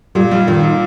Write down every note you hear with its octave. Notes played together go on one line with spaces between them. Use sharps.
A#2 G3
F3 G3
A#2 D#3
A#2